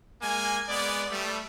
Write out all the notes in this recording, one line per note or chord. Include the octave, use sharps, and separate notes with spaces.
G#3 A#3 G#5
G#3 B3 D5
G3 A3